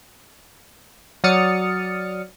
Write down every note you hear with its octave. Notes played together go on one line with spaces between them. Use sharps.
F#3 D5 D#6 F6 A6 C#7